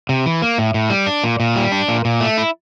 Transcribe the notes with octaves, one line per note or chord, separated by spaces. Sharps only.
C3
E3
A#3
A2
A2
G3
D4
A#2
A#2
G3
D4
A#2
A#2
A3
E4